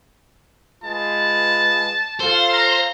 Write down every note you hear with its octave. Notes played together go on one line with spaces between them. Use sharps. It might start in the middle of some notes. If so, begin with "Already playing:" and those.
G#3 F4 B4 A5
F4 A4 C5 F5
A#5